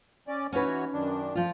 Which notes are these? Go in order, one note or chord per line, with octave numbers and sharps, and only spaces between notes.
C#4 D5
E3 C#4 D#4 F#4 B4 C#5
F#2 D#3 D4
F2 F3 F4